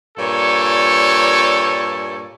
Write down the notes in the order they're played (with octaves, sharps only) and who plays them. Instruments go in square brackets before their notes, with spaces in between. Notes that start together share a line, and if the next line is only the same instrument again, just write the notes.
[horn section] G2 A#2 A4 C#5